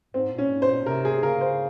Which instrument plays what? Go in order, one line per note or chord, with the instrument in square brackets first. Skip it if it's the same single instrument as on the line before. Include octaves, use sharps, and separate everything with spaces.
[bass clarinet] G#2 [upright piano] C4
[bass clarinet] A#2
[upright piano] C#4
[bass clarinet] G#2
[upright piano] C5
[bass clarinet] A#2
[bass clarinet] C3 [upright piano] A#4
[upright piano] G#4
[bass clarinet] C#3 [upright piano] A#4
[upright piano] C5